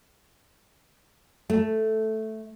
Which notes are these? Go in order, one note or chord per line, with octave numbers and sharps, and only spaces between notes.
A3